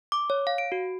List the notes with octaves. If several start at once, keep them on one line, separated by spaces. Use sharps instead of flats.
D6
C#5
F5
D7
F#4